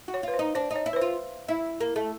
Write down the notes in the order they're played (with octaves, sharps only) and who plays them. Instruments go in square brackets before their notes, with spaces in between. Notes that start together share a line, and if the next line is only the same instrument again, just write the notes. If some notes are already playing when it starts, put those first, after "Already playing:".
[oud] F#4
[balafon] C#5
[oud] F4 [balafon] B4
[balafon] C5
[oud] D#4
[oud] D4 [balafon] C5
[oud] D#4 [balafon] C#5
[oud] E4
[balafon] B4
C5
[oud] F4
E4
A#3
A3